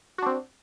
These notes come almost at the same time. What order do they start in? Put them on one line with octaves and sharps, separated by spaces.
F#4 D4 C4